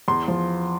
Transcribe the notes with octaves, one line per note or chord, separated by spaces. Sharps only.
E2 C6
F3